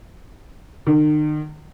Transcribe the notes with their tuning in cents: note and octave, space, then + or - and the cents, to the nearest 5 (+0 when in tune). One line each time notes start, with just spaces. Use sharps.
D#3 -40